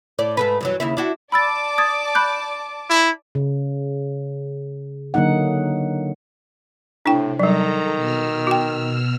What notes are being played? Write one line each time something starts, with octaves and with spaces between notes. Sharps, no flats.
A2 D5
G#2 A3 B4
G2 E3 F#3
D#2 C#3 E4
D4 E4 F#4
D5 A5 B5 D6 E6 A6
D#6 G#6 A6
B5 F#6 G6
E4
C#3
D3 F#3 A#3 D#4 F#5
A2 C3 D4 E4 G5
D#3 F#3 G3 A4 A#5
B2 E6 F6
F#4 G5